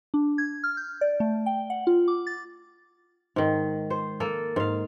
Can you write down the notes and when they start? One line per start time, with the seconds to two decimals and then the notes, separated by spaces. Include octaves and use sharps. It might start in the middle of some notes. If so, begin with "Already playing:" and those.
0.14 D4
0.38 G#6
0.64 F6
0.77 G6
1.01 D5
1.20 A3
1.46 G5
1.70 F#5
1.87 F4
2.08 D6
2.27 A6
3.36 G#2 D#3
3.90 C5
4.20 A#3 A4
4.56 G#2 F5